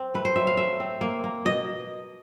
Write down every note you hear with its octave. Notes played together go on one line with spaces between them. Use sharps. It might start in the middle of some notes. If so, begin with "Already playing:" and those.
Already playing: C4
A3 B4
C5
F#3 E5
F5
A3 E5
C4
A#3
A#3
B2 D#5